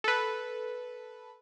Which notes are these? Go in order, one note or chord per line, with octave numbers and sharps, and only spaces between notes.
A4 B4